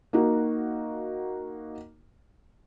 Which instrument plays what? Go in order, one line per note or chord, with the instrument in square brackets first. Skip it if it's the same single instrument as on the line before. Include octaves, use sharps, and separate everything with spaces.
[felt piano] A#3 D#4 F#4